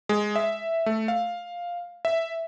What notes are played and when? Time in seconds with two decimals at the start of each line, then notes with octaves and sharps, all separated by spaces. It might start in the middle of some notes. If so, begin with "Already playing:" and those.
0.09 G#3
0.36 E5
0.86 A3
1.08 F5
2.05 E5